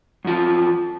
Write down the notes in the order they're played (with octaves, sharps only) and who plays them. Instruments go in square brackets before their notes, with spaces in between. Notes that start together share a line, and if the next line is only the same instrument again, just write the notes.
[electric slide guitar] F#2 F3